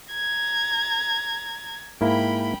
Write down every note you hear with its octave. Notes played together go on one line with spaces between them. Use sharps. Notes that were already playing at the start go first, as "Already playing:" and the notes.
A#5 G#6
G#2 A#3 E4 G5 B5